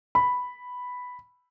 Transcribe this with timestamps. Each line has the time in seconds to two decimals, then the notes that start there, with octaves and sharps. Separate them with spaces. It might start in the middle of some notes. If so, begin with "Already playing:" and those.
0.15 B5